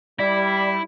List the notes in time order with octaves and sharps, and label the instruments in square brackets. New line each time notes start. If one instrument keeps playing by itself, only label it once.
[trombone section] G3 [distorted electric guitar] E4 [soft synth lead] D5